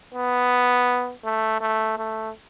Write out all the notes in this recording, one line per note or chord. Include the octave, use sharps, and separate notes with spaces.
B3
A3
A3
A3